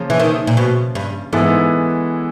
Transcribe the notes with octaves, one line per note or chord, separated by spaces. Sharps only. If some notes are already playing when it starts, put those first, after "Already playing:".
Already playing: C#3 F3 A#3 C#4 F4
E3
D#3
A#2
B2
G2
G#2 E3 G#3 B3 E4 A4